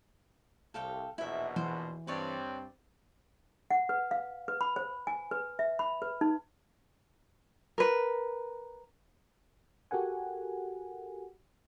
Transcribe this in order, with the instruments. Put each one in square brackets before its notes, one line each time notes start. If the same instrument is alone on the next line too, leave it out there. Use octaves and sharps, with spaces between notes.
[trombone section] C2 [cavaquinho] A4 F5 G5
[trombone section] A#1 E2 B2 [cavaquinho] E4 E5
[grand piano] E3 [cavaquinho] C5
[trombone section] G2 C4 [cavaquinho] B4 C#5 D5
[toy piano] F#5
B4
F5
B4
B5
C5
G#5
B4
E5
B5
B4
D#4
[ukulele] A#4 B4
[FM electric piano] F#4 G4 A4 A#4 F#5 G#5